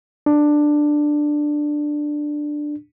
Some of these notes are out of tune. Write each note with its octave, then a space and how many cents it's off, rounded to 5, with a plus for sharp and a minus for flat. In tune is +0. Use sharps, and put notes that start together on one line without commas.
D4 +10